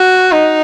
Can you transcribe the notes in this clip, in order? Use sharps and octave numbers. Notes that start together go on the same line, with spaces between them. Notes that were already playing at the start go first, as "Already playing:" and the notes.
Already playing: F#4
D#4